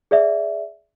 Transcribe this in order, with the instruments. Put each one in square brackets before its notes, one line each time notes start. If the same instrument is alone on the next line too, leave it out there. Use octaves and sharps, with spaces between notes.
[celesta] G#4 D5 E5